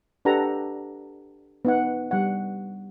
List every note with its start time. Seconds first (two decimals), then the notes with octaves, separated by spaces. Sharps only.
0.25 D4 G4 A4 B4 F#5 A#5
1.65 B3 D#4 F#5
2.11 G3 F#5